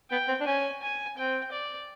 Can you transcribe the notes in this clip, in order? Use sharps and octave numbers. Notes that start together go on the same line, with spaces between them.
B3 G5
C4
D4
C#4 G#5
G#5
C4 G5
D5